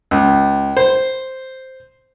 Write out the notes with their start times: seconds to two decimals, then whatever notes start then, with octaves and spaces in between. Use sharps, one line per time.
0.11 C#2
0.77 C5